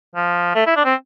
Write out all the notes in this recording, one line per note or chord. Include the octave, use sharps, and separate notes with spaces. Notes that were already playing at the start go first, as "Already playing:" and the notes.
F3
A3
E4
D4
C4